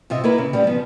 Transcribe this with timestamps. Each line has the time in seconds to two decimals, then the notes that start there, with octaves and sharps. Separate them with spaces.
0.10 C3 F4 D#5 E5
0.24 A#3 E4 A#4 B4
0.38 C#3
0.53 A2 C#3 G3
0.67 F3 B3